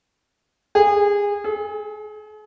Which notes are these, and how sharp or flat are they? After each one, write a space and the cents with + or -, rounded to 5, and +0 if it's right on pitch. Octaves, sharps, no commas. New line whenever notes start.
G#4 -25
G#4 +40